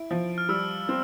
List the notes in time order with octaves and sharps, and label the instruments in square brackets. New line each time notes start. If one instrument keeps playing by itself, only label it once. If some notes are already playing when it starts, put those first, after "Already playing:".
Already playing: [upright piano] E4 [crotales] D7
[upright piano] F3
[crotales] F6
[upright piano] G3 [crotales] E6
[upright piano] C4